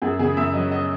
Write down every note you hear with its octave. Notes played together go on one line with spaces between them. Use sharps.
F#2 G#4
C#3 G#4
F#2 E5
F#3 D#5
D#5